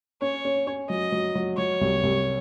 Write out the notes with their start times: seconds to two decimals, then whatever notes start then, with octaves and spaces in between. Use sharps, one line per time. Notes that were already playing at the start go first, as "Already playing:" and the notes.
0.21 C#4 C#5
0.45 C#4
0.67 C#4
0.89 F#3 D#5
1.12 F#3
1.35 F#3
1.58 F#3 C#5
1.81 C2
2.03 C2